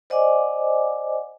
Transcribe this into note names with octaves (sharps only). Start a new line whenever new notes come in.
C5 D5 D#5 F#5 G#5 D6